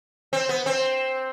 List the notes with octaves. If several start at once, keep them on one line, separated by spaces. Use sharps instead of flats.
C4
B3
C4